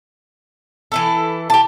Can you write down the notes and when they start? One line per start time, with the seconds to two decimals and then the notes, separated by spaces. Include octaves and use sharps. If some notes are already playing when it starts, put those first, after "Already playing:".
0.92 E3 E4 A4
1.50 G4 A5